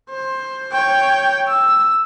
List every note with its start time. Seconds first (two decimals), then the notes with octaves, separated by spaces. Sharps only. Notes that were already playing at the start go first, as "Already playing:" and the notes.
0.10 C5
0.72 C#5 G5
1.48 E6